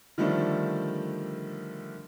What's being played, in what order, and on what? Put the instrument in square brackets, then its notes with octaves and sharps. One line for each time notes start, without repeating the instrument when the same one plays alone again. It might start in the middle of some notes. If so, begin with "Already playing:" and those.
[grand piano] D3 D#3 F3 G3 A3 D4